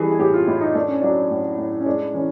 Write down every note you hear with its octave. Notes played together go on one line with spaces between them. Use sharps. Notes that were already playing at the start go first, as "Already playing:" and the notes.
Already playing: E3 G3 G#4 A4
G#4
A2 G4
F4
A2 E4
D#4
A3 D4
C#4
F#3 D4
A2
A2
C#4
G#3 D4
E3 C#4